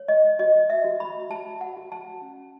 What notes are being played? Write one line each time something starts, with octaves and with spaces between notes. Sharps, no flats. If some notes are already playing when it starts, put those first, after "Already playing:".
Already playing: C#5
D#5
F#4 D#5
E5
F#4
B5
F#4 A5
F#5
F#4
A5
C#4